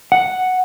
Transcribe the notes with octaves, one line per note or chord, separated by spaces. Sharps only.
F#5